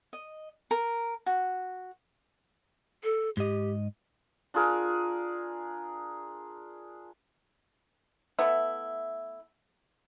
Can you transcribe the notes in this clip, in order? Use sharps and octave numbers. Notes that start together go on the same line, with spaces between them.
D#5
A#4
F#4
A4
G#2 G4 D#5
D4 F4 G#4 A#4
A3 B3 E4